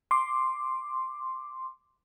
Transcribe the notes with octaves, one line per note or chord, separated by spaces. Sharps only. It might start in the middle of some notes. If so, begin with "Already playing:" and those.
C6 D6